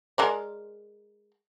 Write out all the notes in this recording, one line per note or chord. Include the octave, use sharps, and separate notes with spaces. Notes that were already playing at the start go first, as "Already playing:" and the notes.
G#3 A#4 D5